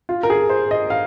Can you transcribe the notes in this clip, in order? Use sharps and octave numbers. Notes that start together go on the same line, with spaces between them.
F4
A#4
G#4
C5
D#5
F5